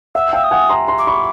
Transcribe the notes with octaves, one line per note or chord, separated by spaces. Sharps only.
E5 F#5 E6
F5 G5 E6
D#6
F#5 G#5
A#5 C6
A#5 C6
D6
B5 C#6